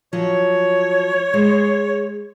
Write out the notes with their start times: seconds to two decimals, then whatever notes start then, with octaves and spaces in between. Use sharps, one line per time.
0.13 F3 F#3 C#5
1.34 G#3 C5